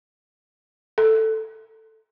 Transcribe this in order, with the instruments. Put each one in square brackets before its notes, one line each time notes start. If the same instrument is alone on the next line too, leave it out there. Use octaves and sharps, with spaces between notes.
[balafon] A4